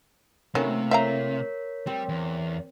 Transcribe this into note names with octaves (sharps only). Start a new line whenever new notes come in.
C3 D#3 F#3 A3 A#3 C#4 E4
A#4 C#5 E5 F5 A#5 B6
G3 C4
E2